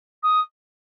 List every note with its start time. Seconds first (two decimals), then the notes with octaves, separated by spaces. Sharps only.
0.23 D#6